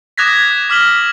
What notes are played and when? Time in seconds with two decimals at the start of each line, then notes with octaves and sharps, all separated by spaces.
0.18 D6 D#6 F#6 G#6 A#6 B6
0.70 D6 F6 B6 F#7 G7